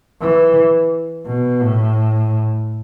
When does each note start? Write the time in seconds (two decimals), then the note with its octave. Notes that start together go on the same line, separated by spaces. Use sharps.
0.21 E3
1.26 B2
1.61 A2